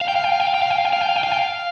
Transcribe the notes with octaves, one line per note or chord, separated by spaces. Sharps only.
F5
G5
F5
G5
F5
G5
F5
G5
F5
G5
F5
G5
F5
G5
F5
G5
F5
G5
F5